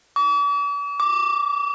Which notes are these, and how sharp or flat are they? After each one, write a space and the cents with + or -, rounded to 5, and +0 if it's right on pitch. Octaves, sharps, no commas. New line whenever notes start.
D6 -45
D6 +0